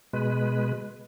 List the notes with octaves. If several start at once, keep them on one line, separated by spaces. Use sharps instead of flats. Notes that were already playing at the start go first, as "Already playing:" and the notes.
B2 G#3 B4